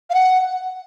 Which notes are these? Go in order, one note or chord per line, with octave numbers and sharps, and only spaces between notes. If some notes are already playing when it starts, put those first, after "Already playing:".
F5
F#5